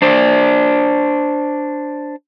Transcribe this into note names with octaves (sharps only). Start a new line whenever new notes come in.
D4 C5 D5